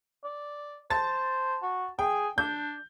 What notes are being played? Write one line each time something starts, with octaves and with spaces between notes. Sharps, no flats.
D5
C5 A5 A6
F#4
G#4 G5
D4 G6